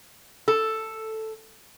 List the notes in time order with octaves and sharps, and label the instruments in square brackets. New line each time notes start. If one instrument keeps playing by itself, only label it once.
[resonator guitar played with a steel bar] A4